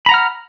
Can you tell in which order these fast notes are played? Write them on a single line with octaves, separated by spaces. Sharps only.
B5 A#5 F#5 F6